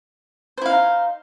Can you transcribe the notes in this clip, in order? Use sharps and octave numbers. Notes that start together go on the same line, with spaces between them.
D#4 E4 C5 F5